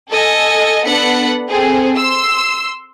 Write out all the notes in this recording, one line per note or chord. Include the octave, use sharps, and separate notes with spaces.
A4 D#5 G#5
B3 D4 A4 F#5 B5 C#7
C4 G#4 A4
C6 E6